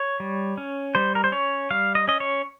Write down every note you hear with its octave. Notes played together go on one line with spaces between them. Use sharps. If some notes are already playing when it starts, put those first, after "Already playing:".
Already playing: C#5
G3
C#4
G3 C5
A#4
C5
C#4 C#5
G3 F5
D#5
C#4 D#5
C#5